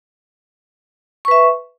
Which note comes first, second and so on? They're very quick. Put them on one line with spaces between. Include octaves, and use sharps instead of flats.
C#6 B4 E5